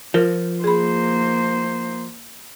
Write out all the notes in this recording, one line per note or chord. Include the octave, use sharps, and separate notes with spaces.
F3 F4 A#4
A#3 G#4 C5 B5